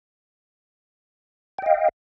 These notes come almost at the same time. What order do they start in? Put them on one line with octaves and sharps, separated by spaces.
G5 D#5 F5